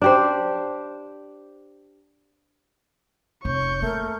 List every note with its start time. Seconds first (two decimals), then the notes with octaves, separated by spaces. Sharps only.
0.02 D4 G4 C5
3.45 F1 C#5 C#6 G6
3.82 A3 A#3 A#4